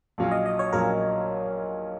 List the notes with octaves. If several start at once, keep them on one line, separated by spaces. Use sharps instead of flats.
A#1 A#2 F#3 C#4 F4
D#5
D#5
C#5
A#1 A#2 F#3 C#4 F4 A#4